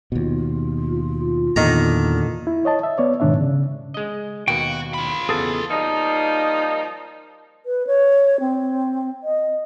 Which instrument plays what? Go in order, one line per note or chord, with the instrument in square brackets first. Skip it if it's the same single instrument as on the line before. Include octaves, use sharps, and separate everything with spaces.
[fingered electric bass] D#2 B2 [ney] F4
[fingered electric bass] E2 [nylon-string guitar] A#2 D3 A4 [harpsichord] D#3 A#5
[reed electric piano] E4
C#5 D#5 A5
E5
B3 C#5 D5
G#2 B2 D#3 D4 C#5 E5
C#3
[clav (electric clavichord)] G#3 D#5
[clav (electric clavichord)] D#2 B2 A#3 [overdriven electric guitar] F#4 [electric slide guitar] G5
[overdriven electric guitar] F4 B5
[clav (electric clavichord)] E2 C#3 B3 [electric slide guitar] G#4 A4
[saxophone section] F3 G3 A#3 D#4
[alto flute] B4
C#5
C4
D#5